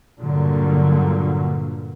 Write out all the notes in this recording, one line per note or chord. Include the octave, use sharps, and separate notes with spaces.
G2 A#2 D3 F#3